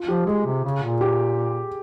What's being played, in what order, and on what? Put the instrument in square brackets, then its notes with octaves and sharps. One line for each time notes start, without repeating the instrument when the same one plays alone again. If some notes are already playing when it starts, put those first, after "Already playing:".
Already playing: [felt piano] F4
[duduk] F3 [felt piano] G4
[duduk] G#3 [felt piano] G#4
[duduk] C3
C#3
A#2
[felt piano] G4